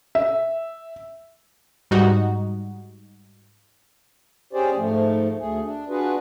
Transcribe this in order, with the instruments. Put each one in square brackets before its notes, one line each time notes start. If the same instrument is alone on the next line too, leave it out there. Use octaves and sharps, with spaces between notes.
[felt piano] E5
[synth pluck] G#2 G3 D#4 F#4
[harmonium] C#4 G4 G#4 C5 D5
G#2 F3 A3
D2 A3 G#4
D4
D4 F4 F#4 G#4 B4